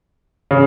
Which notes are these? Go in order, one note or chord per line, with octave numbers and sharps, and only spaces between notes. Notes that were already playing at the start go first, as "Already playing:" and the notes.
C#3